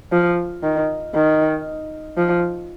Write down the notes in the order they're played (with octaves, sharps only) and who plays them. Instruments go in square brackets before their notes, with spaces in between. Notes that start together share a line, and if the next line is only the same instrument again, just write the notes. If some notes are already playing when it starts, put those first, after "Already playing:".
[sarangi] F3
D#3
D#3
F3